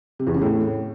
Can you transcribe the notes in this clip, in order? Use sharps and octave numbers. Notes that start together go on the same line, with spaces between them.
C3
E2
C#3
A2